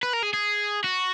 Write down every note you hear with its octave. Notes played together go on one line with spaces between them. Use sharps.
B4
A#4
G#4
G#4
F#4